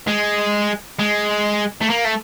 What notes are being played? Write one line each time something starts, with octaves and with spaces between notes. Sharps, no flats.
G#3
G#3
A3
A#3
A3